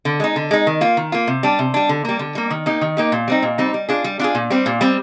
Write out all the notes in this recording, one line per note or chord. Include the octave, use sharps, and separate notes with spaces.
D3
G#3 D#4
D3
G#3 D#4
D#3
A#3 F4
D#3
A#3 F4
C3
G3 D4
C3
G3 D4
D3
G3 A#3
D3
G3 A#3
D#3
A#3 D#4 G4
D#3
A#3 D#4 G4
A#2
G3 C4 D#4
A#2
G3 C4 D#4
G3
D4 F4 G#4
G3
D4 F4 G#4
A#2
G3 C4
A#2
G3 C4